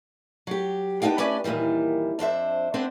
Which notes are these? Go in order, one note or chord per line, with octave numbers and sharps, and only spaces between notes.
F#3 G4
B3 D4 D#4 F5 G5
A3 C#4 B4 D5 G#5
D#2 A#2 D#3 E3 G3
F2 D4 C5 E5
B3 C4 D4 C5